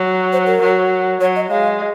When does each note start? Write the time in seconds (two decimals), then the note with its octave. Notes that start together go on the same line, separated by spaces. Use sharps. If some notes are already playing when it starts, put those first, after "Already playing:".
Already playing: F#3
0.32 C5
0.47 A#4
0.62 F#3
1.21 F#3 C#5
1.36 D#5
1.50 G#3 F5